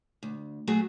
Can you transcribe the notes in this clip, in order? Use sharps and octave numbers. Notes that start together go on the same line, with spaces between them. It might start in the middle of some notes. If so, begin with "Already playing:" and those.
D2
F#3 A3 F#4 G#4